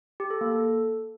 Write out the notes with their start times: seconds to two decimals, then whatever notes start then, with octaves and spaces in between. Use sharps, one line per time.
0.20 G4
0.30 A4
0.41 A#3
0.52 A4